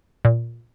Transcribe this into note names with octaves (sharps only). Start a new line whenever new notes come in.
A#2